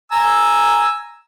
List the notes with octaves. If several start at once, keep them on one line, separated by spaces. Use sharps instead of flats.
G#5 A#5 E6